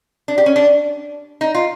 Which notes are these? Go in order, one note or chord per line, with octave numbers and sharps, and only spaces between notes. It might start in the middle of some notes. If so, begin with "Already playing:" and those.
D4
G4
C#4
D4
D#4
F4